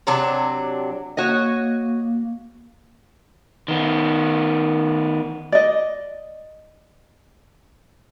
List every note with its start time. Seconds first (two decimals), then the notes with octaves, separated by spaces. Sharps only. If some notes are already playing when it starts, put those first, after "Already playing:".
0.07 C3 F#3 D4
1.17 A#3 F#4 C#5 D#5
3.68 D#3 B3
5.52 D5 D#5